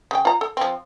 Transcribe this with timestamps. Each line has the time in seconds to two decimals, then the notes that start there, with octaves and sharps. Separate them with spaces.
0.11 C#3 G5
0.25 F4 A#5
0.41 A4
0.57 F3 C4